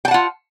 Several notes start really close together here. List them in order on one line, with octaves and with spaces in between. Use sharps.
G5 A5 F#5 F4